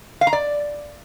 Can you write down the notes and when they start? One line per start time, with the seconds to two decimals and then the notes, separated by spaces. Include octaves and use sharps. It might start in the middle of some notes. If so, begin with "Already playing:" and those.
0.21 F5
0.27 A#5
0.33 D5